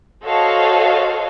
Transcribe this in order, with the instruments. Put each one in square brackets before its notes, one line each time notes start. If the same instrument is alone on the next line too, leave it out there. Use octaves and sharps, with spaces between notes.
[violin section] F#4 A4 C5 C#5 D#5 F5